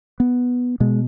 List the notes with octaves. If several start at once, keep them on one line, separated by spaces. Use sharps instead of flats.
B3
B2 G#3